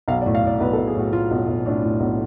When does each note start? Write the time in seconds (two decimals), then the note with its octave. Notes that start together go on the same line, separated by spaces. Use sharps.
0.08 B1 F5
0.21 D5
0.26 A2
0.35 F5
0.44 A2 D5
0.60 B1 B4
0.73 A4
0.78 B1
0.87 G#4
0.95 A2 F#4
1.13 A2 F4
1.31 B1
1.48 B1
1.65 A2 D4
1.83 A2
2.00 B1